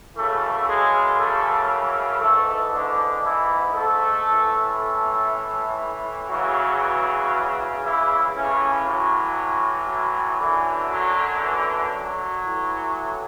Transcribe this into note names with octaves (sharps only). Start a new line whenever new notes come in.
F#2 C#3 E3 A3 A4
G#3 G#4
A3 A4
G#2 E3 A3 A4
D3 D4
E3 E4
A3 A4
A2 E3
A3 A4
E2 C#3 E3 F#3 F#4
E3 E4
A2 C#3 E3 C#4
F#3
F#3
F#2 D3 E3
F#3
E3
F#3
A2 E3